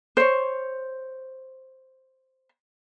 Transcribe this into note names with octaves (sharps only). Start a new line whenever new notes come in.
C5 C#5